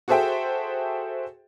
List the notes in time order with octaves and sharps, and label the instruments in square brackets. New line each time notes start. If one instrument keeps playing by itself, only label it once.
[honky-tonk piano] F#4 G#4 A4 C5 E5 G5